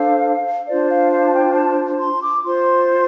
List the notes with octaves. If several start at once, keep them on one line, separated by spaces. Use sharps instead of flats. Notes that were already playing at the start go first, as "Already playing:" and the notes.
Already playing: D4 A4 C5 F5
D4 F4 C5 D5
F5
F5
A5
G5
A5
C6
D6
F4 C5 C6